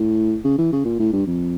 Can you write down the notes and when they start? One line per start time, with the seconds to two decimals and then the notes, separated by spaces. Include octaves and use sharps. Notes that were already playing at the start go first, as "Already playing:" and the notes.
Already playing: A2
0.44 C#3
0.58 E3
0.72 C#3
0.85 A#2
0.99 A2
1.13 G2
1.27 F2